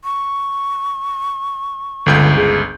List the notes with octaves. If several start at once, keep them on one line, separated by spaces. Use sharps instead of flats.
C#6
G1 C#2 D3 G6
G#4